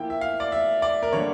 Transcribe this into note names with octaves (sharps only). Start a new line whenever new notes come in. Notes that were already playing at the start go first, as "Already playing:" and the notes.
Already playing: F3 A#3 E4 G5
E5
F5
D5
E5
D5
A#4
D3 G3 A#3 D4 C#5